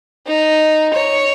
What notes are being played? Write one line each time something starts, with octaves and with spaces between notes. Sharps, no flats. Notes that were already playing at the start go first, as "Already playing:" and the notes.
D#4
C#5